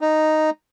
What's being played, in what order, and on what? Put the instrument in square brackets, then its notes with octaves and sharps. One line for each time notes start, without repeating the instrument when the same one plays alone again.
[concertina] D#4